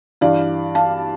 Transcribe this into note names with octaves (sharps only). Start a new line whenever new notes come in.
G2 E3 D5 F5
F5 A5